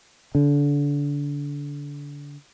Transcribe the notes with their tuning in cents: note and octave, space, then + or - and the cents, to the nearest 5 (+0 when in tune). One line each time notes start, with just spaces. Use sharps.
D3 -30